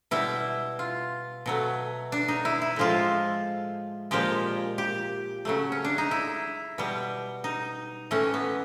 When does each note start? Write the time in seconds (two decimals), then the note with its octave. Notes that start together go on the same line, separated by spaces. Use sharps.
0.11 B2 G3 E4
0.79 F4
1.46 B2 F#3 A3
2.12 D4
2.28 D#4
2.45 E4
2.62 E4
2.76 A2 F3 G#3 F4
4.11 A#2 F3 G#3 G4
4.78 G4
5.45 C#3 F#3 A3
5.72 C#4
5.84 D4
5.98 D#4
6.11 E4
6.78 B2 G3
7.44 D#4
8.11 A2 E3 A3 C#4
8.34 B3